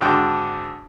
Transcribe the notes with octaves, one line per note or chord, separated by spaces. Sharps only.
G#1 G#2 D3 D4 F#4 G5